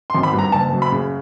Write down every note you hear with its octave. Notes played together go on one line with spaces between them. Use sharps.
C6
G#1
B5
G2
A#5
F#1 A5
F#2
B5
C#3